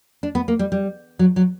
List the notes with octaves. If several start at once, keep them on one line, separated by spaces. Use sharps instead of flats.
D4
B3
A#3
G3
G3
F#3
F#3